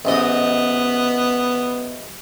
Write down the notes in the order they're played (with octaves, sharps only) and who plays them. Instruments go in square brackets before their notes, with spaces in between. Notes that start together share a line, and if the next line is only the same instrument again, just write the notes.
[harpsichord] A1 G#2 D#5 [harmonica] B3